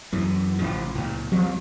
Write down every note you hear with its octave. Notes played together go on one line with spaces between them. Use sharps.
F#2 E3
A1 C#3 F3
C#2 A#2
F3 G3 G#3 C4